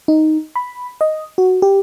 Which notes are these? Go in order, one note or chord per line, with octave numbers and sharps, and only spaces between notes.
D#4
B5
D#5
F#4
G4